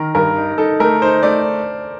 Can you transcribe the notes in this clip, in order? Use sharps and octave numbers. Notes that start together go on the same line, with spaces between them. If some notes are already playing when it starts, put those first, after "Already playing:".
Already playing: D#3 A#4
G2 A#4
D#4
D#4 A4
A3 A#4
D#4 C5
A3 D5